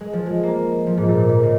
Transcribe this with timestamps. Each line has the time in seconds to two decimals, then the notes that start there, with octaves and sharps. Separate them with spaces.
0.01 G#3
0.13 F3
0.26 G#3
0.43 A#3
0.87 F3
0.98 G#2
1.08 A#2
1.29 G#2
1.43 C#3